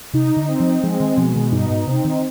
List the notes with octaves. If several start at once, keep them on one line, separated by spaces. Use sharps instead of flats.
C3 D#4
D3
C4
F3
F3 G#3
D#3
B2 F3
D#3
G2 D#4
G#2
C3 C4
D#3